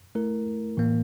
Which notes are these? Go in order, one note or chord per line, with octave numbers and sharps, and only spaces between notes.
A3 E4 A#4
A2 E3 A#3